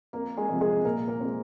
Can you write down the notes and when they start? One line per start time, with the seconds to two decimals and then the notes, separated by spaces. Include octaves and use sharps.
0.13 F2 A#3 A#4
0.37 G#3 G#4
0.49 C3 F3 G#3
0.61 G#3 G#4
0.85 A#2 A#3 A#4
1.08 A#3 A#4
1.20 C4
1.25 G#3